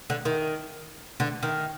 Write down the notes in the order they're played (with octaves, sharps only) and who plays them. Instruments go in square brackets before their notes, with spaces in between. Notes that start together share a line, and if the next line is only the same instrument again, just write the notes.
[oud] D3
D#3
D3
D#3